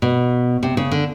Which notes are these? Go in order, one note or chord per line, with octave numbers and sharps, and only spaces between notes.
B2
C3
C#3
D3